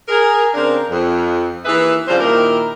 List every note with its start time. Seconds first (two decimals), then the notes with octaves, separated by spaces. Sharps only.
0.08 G#4 A#4
0.54 C#3 C4 D4 A#4
0.90 F2
1.65 D#2 E3 G#4 B4 E5
2.07 C#3 F3 G3 C4 F4 C5
2.20 A#2 D#3 E4 G4 A#4